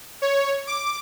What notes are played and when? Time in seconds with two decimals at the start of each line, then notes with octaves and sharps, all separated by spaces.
0.22 C#5
0.67 D6